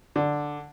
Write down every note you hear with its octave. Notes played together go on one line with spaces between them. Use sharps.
D3